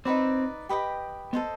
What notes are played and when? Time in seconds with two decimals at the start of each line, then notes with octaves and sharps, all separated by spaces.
0.05 C4 D#4 F#4 B4 D5
0.69 G4 B4 D#5 G5
1.33 B3 A4 C5 D#5